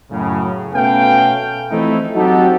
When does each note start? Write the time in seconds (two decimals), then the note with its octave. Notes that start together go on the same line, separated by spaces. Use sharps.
0.11 F#2 A2 C#3
0.74 B2 A3 B3 C#4 F5 G5
1.71 E3 F3 A3 C4 D#4 E4
2.15 F#3 C4 D#4 F#4 G4 A4